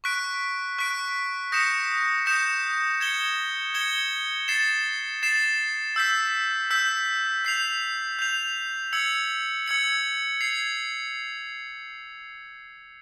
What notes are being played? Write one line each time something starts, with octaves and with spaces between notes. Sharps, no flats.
C#6 F#6 B6 D7
C#6 F#6 B6 D7
D#6 G6 A#6 C#7 E7
D#6 G6 A#6 C#7 E7
G#6 C#7 E7 G7
G#6 C#7 E7 G7
A6 C7 E7
A6 C7 E7
E6 G6 B6
E6 G6 B6
G6 C7 F7
G6 C7 F7
E6 G#6 C#7 F#7
E6 G#6 C#7 F#7
G#6 C7 F7